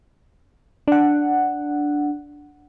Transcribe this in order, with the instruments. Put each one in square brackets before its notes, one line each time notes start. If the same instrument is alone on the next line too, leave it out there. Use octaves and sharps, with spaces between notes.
[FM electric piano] D4 F#5